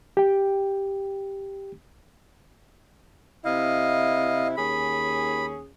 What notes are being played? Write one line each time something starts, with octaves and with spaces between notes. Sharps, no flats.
G4 G5
C3 E4 D#5 F5
D#2 C#4 G#4 B5